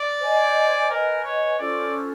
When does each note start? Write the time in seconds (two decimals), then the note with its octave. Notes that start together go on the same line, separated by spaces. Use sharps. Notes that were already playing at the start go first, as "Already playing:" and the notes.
Already playing: D5
0.20 C5 D#5 G#5
0.90 A#4 B4 D#5 G#5
1.24 C#5
1.59 C#4 F4 A4 C5 D5